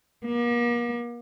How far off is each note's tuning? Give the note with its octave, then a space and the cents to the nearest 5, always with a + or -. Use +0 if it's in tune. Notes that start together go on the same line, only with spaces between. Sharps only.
A#3 +40